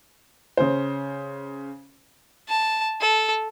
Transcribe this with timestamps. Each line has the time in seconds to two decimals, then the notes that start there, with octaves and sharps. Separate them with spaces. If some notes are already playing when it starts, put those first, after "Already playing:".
0.57 C#3 C5
2.49 A5
3.00 A4